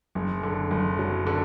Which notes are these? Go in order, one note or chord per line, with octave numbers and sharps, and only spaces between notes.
F#1
D3
F#1
F#3
D3